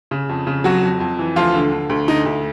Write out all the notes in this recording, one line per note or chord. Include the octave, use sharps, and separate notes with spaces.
C#3
F2
C#3
F2 F#3 F#4
F2
F2
E3
D2 F3 F4
D3
D3
D2
D3 D#4
D2